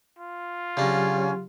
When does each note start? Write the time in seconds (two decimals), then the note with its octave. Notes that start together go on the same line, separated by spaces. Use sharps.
0.19 F4
0.77 C#3 F#3 C#4 D4 G4